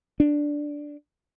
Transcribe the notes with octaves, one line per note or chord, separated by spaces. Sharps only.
D4